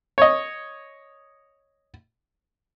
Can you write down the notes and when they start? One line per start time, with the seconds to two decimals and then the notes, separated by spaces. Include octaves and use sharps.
0.18 C#5 D#5